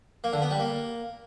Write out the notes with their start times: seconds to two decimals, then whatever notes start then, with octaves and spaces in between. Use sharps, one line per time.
0.24 A#3
0.33 D3
0.42 B3
0.51 G3
0.60 A#3